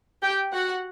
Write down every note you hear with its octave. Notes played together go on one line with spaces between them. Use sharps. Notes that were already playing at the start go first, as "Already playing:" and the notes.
G4 G5
F#4 F#5